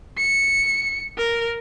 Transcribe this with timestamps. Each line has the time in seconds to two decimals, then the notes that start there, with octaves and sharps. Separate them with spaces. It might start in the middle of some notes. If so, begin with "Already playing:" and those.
0.18 C#7
1.18 A#4